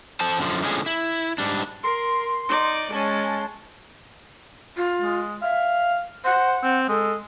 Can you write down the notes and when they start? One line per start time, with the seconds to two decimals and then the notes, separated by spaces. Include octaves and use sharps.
0.20 A4 C5 A5
0.38 F#2 D3 F3
0.62 A2 D3 F3 G#3 C#4 G#4
0.86 E4
1.38 G#2 G3 D4
1.83 A#4 C6
2.49 D#4 D5
2.92 G#3 C#4 A5
4.77 F4
5.02 G#3
5.42 E5 F5
6.25 C5 F#5
6.63 C4
6.89 G#3 A4